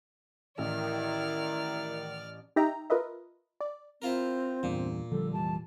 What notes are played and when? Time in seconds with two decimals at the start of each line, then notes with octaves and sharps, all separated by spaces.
0.58 A1 D#3 E4 D5 F6
2.56 D#4 G4 D#5 E5 G5 A#5
2.90 F4 A#4 B4 D#5 E5
3.60 D5
4.02 C4 E4 F4 A#4
4.63 E2 G2 A#2
5.11 D3 F3 G3 A4
5.33 F1 E3 G3 A5